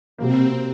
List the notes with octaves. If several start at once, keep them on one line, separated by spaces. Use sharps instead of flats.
C3 F#3 A#3 C4